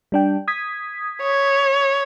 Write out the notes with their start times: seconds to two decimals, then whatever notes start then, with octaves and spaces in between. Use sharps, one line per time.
0.12 G3 D4 G5
0.48 D#6 G#6 B6
1.22 C#5